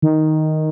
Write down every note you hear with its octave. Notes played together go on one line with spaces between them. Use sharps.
D#3